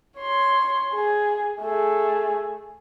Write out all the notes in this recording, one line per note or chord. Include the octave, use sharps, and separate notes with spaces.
C#5 C6
G#4
A3 G#4